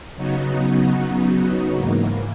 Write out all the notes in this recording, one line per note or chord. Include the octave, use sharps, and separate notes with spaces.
C#3 F#3 B3 D#4 F#4
G#2 E3 A#3